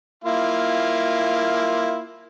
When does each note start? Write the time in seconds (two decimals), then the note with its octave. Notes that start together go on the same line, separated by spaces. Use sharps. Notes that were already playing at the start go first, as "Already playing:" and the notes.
0.24 A#3 E4 F4